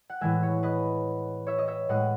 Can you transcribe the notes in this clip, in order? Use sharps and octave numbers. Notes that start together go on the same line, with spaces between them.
F#5
A2 E3 G#3 E5 G#5
C#5
B4 D#5
C#5 E5
D#5
C#5 E5
A2 G#3 D#5 F#5